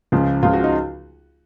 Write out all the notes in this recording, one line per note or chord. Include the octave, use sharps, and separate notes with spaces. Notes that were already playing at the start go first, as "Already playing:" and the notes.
C#2 C#3 F3
C#2 C#3 F3 F4
F#4
D#4